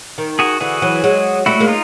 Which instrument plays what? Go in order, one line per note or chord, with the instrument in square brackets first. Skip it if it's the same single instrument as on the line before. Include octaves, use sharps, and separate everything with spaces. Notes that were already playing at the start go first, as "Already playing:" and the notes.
[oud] D#3
[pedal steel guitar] F#4 G#4
[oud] D3 E3 [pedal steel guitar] F#4 G#4
[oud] E3 F#3
F#3 G#3
[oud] G3 A3 [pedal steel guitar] E4 F#4
[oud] G#3 A#3
[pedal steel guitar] D#4 F4